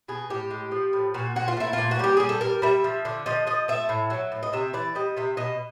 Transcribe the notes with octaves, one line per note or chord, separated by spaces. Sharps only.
B2 G#4
A2 G4
G#3
F3
A2
A#2 F#4
A#2 F#4
F4
A3 E4
A#2 F4
F#4
G3 G4
G3 G#4
A4
G3 A#4
G3 E5
F3
D3
F3 D#5
F3 D#5
A3 E5
A2
F#3
A2
D#5
C3 E5
E3 D5
G3 D#5
C3 E5
B2 D#5